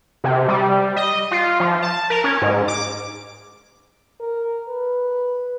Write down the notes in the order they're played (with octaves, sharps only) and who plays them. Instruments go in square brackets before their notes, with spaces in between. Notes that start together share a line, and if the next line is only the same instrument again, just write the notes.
[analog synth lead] C3
G3
D#5
F4
F3
A5
A#4
C#4
G#2
D6
[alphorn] A#4
B4